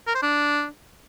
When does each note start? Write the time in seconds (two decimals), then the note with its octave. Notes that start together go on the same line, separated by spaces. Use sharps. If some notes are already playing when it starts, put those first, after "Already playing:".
0.07 A#4
0.15 C5
0.23 D4